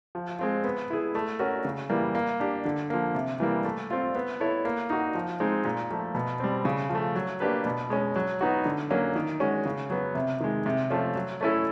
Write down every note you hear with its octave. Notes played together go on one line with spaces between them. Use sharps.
F3
G#3 C4 F4
B3
E4 G#4
A3
C#4 F#4 A#4
C#3
E3 G3 A#3
A#3
D4 G4
D3
F3 A#3
C3
E3 G3 A#3
A3
C4 F4
B3
E4 A4 C#5
A#3
D#4 F#4
F3
G#3 C4 D#4
A#2
F3 A3
B2
G3 C4
C#3
F3
A3
F#3
A#3 D4 G4 B4
B2
G#3 C#4
F#3
B3 D#4 F#4
D3
F#3 A#3 C#4
D#3
G#3 C#4 F#4
C#3
F#3 B3
C3
D#3 G#3
C3
F3 A3 C#4 F4
F#3
A3 C#4 E4 A4